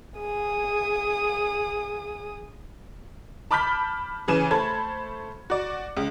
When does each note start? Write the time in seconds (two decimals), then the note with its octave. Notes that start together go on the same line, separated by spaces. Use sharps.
0.19 G#4 D#6
3.51 A5 B5 D6 F6 G6 B6
4.28 C#3 E3 G#5 E7
4.51 A3 C5 A5 B5 G#6
5.50 F#4 D5
5.97 C#2